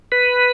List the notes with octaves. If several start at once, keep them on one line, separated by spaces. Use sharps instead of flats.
B4